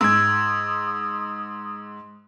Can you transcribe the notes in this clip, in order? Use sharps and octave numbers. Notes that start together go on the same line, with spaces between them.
G#2 D#6 E6 G#6 D7